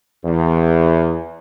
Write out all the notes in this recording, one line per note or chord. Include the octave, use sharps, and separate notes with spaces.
E2